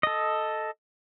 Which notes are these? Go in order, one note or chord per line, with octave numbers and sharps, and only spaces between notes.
A4 D#5